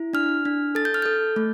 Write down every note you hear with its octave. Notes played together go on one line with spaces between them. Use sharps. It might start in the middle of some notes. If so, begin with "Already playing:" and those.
Already playing: E4
D4 F6
D4
A4 A6
G6
F6
A4 G6
A3